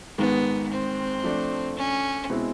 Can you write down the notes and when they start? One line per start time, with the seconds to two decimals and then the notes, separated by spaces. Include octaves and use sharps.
0.18 G#2 D#3 G#3 B3
0.72 C4
1.24 F3 A3 D4
1.77 C#4
2.30 B2 G#3 C4 E4